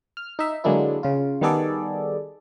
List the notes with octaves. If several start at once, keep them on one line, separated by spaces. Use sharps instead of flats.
F6
D#4 E5
D3 F#3 G#3 A#3 D4 E4
C#3 F4
D#3 G3 B3 G#4 A4 D5